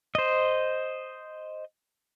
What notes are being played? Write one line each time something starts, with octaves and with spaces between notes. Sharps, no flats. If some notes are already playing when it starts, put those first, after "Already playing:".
C5 D#5